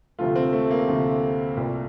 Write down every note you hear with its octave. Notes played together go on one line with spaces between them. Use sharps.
D2 C3 F3 A3 F4
C4
A3
A#3
D2 C3 F3 A3
C2 A#2 A3